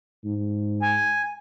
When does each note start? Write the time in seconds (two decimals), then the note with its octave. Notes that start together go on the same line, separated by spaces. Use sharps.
0.25 G#2
0.82 G#5